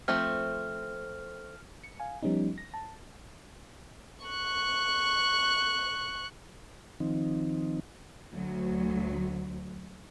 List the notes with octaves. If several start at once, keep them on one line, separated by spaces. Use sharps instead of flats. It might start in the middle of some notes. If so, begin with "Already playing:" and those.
F3 A3 C4 F6
C#7
F5 G#5
F3 G3 B3 C#4 D#4
A#6
A5
C#6 F#6
D#3 F3 C4 D#4
D2 F#3